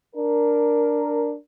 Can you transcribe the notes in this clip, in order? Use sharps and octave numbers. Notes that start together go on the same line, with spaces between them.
D4 A#4